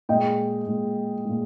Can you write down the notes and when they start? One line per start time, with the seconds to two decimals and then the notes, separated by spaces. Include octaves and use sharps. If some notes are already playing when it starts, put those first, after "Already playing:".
0.09 A#2 G#3 D#5 G5
0.67 A#2 G#3
1.25 A#2 G#3